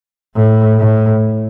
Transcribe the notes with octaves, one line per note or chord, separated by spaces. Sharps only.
A2
A2